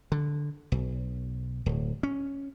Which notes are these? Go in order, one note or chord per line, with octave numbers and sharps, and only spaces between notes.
D3
B1
D1
C#4